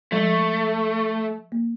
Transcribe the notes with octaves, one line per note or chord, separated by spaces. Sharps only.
F3 G#3 A3
A#3